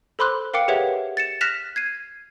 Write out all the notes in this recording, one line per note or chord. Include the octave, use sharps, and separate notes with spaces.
A4 C5 B5 C6 D6 F#6
A#4 F5 G5 D6 C#7
G4 G#4 B4 C#5 E5 F#5
A6 C#7 E7
F6 F#6 A#6 B6 E7 F7
G#6 C7 D#7